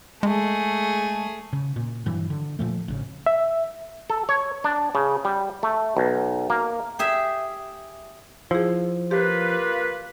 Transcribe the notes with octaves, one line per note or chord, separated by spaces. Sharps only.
G#3 A3 G#4
C#3
A#2
G2 E3 F#3
D3
A#2 F3 A3
G#1 C#3
E5
A4
C#5
D4
C#3
G3
A3
B1
A#3
G4 G#4 E5
F3 E4 G#4
A#3 F4 G4 B4